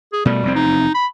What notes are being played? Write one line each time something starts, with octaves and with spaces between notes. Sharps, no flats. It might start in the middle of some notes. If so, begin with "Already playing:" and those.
G#4
B2 G3 A3
F1 E2 C4
D#4
B5